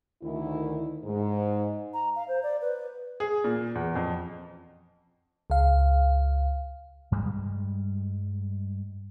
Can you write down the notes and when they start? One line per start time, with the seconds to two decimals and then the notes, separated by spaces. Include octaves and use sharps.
0.23 D2 D#3 E4
1.04 G#2
1.93 A#5
2.15 F5
2.27 C5
2.43 D5
2.61 B4
3.20 G#4
3.44 A#2
3.75 E2
3.95 F2
5.50 C#2 F5
7.12 G2 G3 G#3